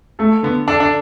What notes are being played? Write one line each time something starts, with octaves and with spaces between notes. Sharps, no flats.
A3 A4
D3 B3
D4 A4
D4